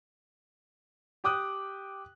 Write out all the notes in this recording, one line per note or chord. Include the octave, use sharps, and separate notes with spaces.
G4 G5 D6 D#6 F#6